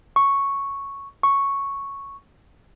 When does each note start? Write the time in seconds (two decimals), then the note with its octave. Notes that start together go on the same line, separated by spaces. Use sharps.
0.16 C#6
1.23 C#6